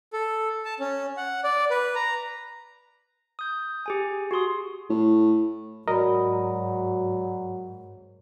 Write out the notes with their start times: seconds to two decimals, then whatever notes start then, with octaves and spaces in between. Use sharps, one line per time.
0.13 A4
0.65 A5
0.80 C#4
1.17 F#5
1.44 D5
1.70 B4
1.95 A#5
3.39 D#6 G6
3.86 G4 G#4 G#5
4.31 F#4 G#4 C6 D#6
4.90 A2
5.88 G#2 F#3 F#4 A#4 D5 D#5 A#5 B5